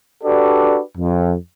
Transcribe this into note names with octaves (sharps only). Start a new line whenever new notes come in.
D4 F#4 G4 A4 B4 D5
F2